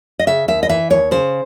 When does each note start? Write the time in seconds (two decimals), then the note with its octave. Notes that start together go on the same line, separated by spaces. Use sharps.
0.19 D#5
0.27 C#3 E5
0.48 D#2 E5
0.63 D#5
0.69 E3 E5
0.90 D#2 C#5
1.11 C#3 C5